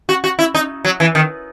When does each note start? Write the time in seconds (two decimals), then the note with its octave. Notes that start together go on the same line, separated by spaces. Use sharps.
0.09 F#4
0.24 F#4
0.39 E4
0.55 D#4
0.85 F#3
1.00 E3
1.15 D#3